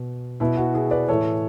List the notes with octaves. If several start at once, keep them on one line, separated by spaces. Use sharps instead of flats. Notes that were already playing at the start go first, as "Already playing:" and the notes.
Already playing: B2
B2 E4
F#4
E4 G#4
B4 D5
A2 E3 A4 C#5